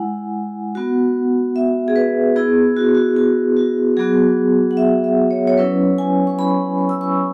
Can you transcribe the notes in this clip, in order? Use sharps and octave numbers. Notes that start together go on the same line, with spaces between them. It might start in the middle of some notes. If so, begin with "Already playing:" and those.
Already playing: G#3 E4 F#5 G#5
B3 F#4
E5
G#4
B4
B3 E4 G#4
F#4
F#4
F#4
F#4
F#3 B3 F#4 G#4
F#5
E5
E5
C#5
C#5
F#3 C#4 E4 B4
G#5
C#6
B5
C#6
E6
C#6